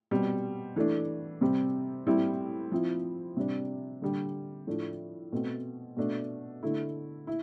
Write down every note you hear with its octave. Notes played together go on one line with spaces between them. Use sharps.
B2 G3 C4
E3 A3 D4
C3 G3 C4
A2 G3 C4 E4
F3 C4 E4
C3 G3 D4
D3 G3 D4
A2 F3 A3 D4
B2 A3 C4
B2 A3 D4
D3 A3 E4
E4